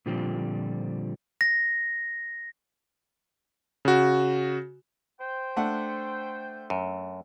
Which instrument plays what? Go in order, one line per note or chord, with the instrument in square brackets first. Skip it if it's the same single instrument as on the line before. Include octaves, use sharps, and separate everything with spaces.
[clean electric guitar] A#2 D3 F3 G3 C4
[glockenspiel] A#6
[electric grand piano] C#3 F#4
[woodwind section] C5 G5
[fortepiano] A3 D4 F#5
[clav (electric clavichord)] F#2